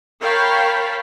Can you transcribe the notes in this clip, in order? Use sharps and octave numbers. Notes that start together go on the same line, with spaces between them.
A#4 C#5 F5 G5 A5 B5